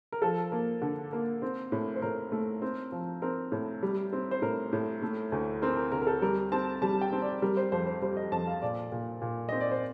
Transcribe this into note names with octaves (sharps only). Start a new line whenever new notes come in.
A#4
F3 A4
A#3
D3
A#3
C4
A2
C5
A2 A#4
A3
C4
F3
C4 A#4
A2
G3
C4
C5
A2 A#4
A2
A3
D2
C4 A#4
A#4
D2 A#4
A#4
A4
G3 A#4
C4 A5
G3 A5
G5
C4
D5
G3 A#4
C5
F2 C5
C5
G3 C5
D#5
F2 A5
F5
A#2 D5
A#2
A#2
C4 D#5
D5
C5